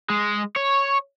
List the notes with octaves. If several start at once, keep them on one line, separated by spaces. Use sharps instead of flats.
G#3
C#5